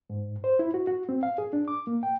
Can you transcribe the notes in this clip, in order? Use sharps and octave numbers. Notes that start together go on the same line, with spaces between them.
G#2
C5
E4
F#4
F#4
C4
F5
G#4
D4
D6
A#3
G5